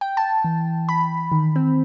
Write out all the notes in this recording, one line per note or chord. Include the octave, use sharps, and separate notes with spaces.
G5
A5
E3
B5
D#3
C4